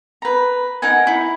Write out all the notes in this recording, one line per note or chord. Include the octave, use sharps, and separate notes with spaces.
B4 A#5
D#4 A#4 F#5 G#5
E4